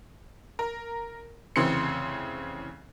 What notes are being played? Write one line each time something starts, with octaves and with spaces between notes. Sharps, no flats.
A#4
F1 C#3 E3 C4 C6 C#7